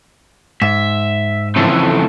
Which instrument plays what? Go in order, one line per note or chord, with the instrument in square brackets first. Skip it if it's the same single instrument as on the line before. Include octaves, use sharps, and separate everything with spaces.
[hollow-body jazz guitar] G#2 [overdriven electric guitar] E5
[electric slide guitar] C#3 E3 F3 [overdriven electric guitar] A3 C4